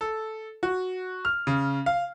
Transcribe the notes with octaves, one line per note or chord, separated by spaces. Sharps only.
A4
F#4
F6
C#3
F5